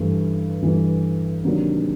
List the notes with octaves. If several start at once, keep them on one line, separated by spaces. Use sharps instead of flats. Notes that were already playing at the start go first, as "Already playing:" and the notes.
Already playing: G2 E3 A3
G2 E3 A3
C3 D#3 F#3 A#3 D4